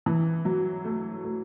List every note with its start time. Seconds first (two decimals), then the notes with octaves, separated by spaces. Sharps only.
0.06 E3
0.45 F#3
0.85 A3
1.24 A3